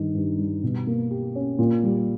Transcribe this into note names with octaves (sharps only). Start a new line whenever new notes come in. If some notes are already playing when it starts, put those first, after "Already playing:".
Already playing: G2 D#3 D#4
G2
G3
B2
A#3
G4
C#4
A#2
G3